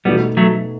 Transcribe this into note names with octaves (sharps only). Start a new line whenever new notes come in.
B2 G3 A3 B3 D#4 F#4
F#3 A3